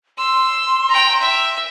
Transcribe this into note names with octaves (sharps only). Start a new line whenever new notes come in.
C6 E6
G5 A#5
E5